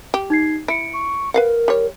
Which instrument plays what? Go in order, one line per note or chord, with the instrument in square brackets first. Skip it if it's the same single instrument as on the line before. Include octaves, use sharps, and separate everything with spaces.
[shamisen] G4
[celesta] D#4 G#6 C7
[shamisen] E4 [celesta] C#7 D7
[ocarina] C#6
[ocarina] A#4 [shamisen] B4 F5 F#5
[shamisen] G3 C#5